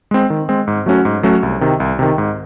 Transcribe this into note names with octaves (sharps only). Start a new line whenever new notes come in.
G#3 C4
D#3
G#3 C4
G#2
F#3 A3 C#4 F#4
G#2
F#3 A3 C#4 F#4
C2
C3 D#3
C2
C3 D#3
G#2